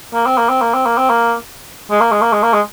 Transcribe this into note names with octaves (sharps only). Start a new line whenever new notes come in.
A#3
C4
A#3
C4
A#3
C4
A#3
C4
A#3
G#3
A#3
G#3
A#3
G#3
A#3
G#3